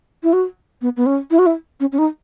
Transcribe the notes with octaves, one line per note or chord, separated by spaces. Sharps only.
E4
F#4
B3
B3
C#4
E4
F#4
E4
C#4
C#4
D#4